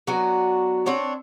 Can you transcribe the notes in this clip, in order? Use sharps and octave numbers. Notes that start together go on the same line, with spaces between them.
F#3 B3 D4 F#4
C4 D4 C#5 A5